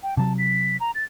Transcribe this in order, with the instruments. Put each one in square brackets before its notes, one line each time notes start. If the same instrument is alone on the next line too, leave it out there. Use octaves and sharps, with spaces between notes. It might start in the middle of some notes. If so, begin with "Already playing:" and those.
[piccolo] G5
[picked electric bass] C3 F#3 [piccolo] A5
[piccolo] B6
A#5
A6